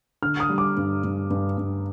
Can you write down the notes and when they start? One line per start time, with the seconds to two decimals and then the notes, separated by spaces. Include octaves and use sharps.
0.22 D3 F6
0.40 D#6
0.49 G3
0.58 D6
0.77 G2
1.04 G2
1.30 G2
1.58 G2